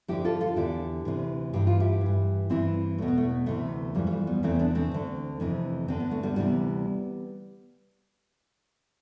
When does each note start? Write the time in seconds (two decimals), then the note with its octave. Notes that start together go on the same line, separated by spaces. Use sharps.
0.08 F2 D3 E4 G4
0.25 F4 A4
0.41 F4 A4
0.56 E2 D3 E4 G4
1.05 D2 C3 E3
1.53 G2 E3 G4
1.67 F4
1.80 E4 G4
2.01 G2 E3
2.50 G2 E3 C4 E4
2.98 E2 B2 A3
3.08 B3
3.18 A3
3.46 D2 C3 E3 A3
3.95 F2 E3 G3
4.07 A3
4.11 G3
4.27 G3 B3
4.43 E2 C3 E3 A3 C4
4.59 B3 D4
4.75 A3 C4
4.92 D2 D3
5.40 F2 C3 E3
5.88 E2 D3 C4
6.00 B3
6.11 A3
6.23 G3 B3
6.36 D2 C3 E3 G3 B3